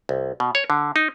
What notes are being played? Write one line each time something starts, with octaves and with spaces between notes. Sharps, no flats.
C2
B2
C#5
D3
D#4